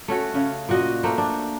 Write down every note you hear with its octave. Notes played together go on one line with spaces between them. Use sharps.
A3 C#4 F#4
C#3 C#4
A#2 F#4 D#5
A3 A#3 C5
D4